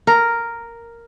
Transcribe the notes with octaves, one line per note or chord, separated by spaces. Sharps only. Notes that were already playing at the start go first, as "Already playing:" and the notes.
A#4